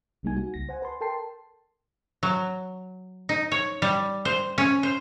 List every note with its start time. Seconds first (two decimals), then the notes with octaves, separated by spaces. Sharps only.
0.23 C2 C3 G3 A#3 D#4 G#5
0.36 F#4
0.54 C#2 A#6
0.69 C5 F#5 G#5
0.82 B4 A5 C6
1.01 A4 A#4 G5 A5 C6 C7
2.23 F#3
3.29 D#4
3.52 C#5
3.82 G3
4.25 C5
4.58 C#4
4.83 C5